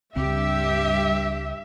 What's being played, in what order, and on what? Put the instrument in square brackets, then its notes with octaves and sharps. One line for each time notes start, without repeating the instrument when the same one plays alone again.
[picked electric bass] C#2 C#3 C4 [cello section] G2 G4 [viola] E5